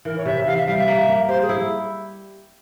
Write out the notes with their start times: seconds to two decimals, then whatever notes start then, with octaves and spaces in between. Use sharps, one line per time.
0.05 E3 A#4
0.18 C#5
0.25 C3 E5
0.47 E3 F5
0.57 E5
0.67 G3 F5
0.77 E5
0.88 A#3
1.09 A#3
1.28 G4 C5
1.42 G#4
1.49 E4